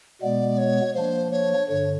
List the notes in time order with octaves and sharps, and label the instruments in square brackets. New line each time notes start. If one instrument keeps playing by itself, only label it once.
[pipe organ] B2 G#3 B3 [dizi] D5
[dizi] C#5
[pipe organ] F3 A#3 D4 [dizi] C5
[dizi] C#5
[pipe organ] G2 D3 [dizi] C#5